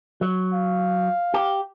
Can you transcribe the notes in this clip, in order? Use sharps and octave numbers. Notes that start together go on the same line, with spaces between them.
F#3
F5
G4